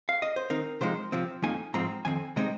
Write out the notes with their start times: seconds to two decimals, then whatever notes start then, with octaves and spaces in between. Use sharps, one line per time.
0.09 F5
0.22 D#5
0.36 C5
0.50 D#3 C4 D#4 A#4
0.81 C3 F3 G#3 D#4 C5
1.12 C3 F3 C4
1.43 F2 F3 A#3 D#4 G#5
1.74 G#2 F3 C4 D#4 A#5
2.05 F2 D#3 C4 G#5
2.36 C3 G#3 C4 D#4 D#5